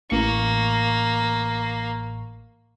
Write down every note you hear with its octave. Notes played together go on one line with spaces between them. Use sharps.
A1 A#3 C#6